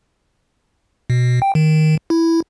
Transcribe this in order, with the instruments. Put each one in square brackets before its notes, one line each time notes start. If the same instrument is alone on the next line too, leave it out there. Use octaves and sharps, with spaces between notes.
[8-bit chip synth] B2
G5
D#3
E4